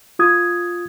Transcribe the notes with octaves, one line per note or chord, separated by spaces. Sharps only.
F4 D#6 G#6